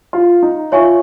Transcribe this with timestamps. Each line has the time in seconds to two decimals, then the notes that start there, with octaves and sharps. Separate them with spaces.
0.13 F4
0.43 D#4
0.72 F4 C#5 E5 G#5 C#6